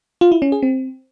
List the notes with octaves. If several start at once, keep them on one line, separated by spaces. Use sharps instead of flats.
F4
E4
C#4
G#4
C4